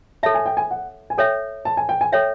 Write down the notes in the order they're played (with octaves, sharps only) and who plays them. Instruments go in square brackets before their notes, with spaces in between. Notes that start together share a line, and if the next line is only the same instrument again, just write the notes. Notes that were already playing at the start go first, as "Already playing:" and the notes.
[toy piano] A4 C#5 E5 [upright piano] A5
[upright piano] G#5
G5
G#5
F#5
G#5
[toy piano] A4 C#5 E5 [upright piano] G5
[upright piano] A5
G#5
G5
G#5
[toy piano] A4 C#5 E5 [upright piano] G5